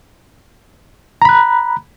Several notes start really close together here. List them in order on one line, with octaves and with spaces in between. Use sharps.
A#5 B5 F#6